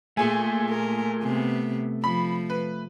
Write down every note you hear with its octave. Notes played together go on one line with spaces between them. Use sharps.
A#2 A3 G#4 G#5
A#4
C3 B3
F3 B5
B4